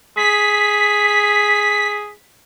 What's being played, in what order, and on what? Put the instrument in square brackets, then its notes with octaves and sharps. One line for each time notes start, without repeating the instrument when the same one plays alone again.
[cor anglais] G#4 [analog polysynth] B6